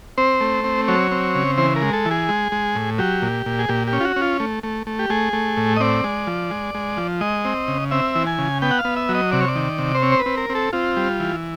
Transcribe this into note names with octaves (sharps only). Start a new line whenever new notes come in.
C4 C5
A3
C4
F#3 C#5
C4
C#3
E3 C5
A#4
G#3
A4
E3
G#4
G#3
G#3
A2
F#3 G4
A#2
A#2
G#4
A#2 G4
G4
C#4
F4
F#4
C#4
F4
A3
A3
A3
G4
A3 G#4
A3
A2
D#5
C4 D5
G#3
F3
G#3
G#3
F3
G#3 D#5
C4
C#3
C4 E5
E3
G#5
C#3
B3 G5
F#5
F5
B3
E5
F#3
D#5
C3 D5
C#5
D5
D#3
C3
C5
C4 C#5
C5
B4
C4
A#4
C4
A4
C4 F4
G3
E3